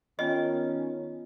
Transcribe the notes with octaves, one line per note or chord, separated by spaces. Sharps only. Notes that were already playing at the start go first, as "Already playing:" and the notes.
D#3 B3 C#4 F4 D#5 G5